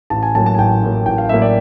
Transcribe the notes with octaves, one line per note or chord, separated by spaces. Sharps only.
A1 A5
G#5
A2 F#3 A#3 A5
A5
G#5
A1 G5
A2 F#3 A#3
A1 G5
F5
A2 F#3 A#3 E5
D5